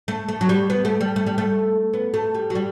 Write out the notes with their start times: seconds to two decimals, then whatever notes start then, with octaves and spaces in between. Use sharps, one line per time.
0.08 A3
0.28 A3
0.41 F#3
0.49 G3
0.70 B3
0.85 A3
1.01 G3
1.16 A3
1.26 G3
1.38 A3
1.94 B3
2.14 A3
2.34 G3
2.50 F#3
2.55 G3